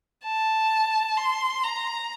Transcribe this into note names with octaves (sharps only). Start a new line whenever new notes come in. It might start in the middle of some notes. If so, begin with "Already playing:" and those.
A5
C6
A#5